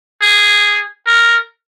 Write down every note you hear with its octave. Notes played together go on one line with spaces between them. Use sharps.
G#4
A#4